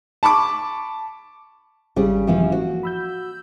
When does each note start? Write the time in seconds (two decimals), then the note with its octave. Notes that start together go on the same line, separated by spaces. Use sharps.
0.23 A5 B5 C#6 D6
1.96 G#1 C#3 G3 C#4 G#4
2.27 F#2 E3 F3 A#3 C#4 F5
2.52 F#4
2.83 B5 E6 G6